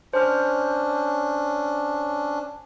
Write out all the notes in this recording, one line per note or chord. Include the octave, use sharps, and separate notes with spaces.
C#4 D4 C5 F6